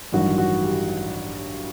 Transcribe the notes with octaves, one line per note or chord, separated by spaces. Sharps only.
A1 G2 D#3 F#3 F#4
F#4
G4